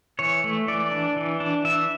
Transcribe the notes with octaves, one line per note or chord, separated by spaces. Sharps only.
E3 C#5
A3
E3 D5
D4
E3
D4
E3 E5